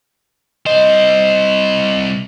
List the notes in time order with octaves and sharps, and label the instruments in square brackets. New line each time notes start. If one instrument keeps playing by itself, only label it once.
[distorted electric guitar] C2 C5 [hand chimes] D#5